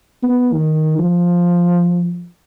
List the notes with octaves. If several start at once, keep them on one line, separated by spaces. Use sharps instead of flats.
B3
D#3
F3